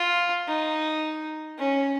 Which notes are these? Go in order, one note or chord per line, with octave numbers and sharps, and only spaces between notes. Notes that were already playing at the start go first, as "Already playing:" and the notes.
Already playing: F4
D#4
C#4